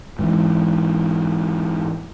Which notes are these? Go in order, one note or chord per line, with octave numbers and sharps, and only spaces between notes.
G#2 E3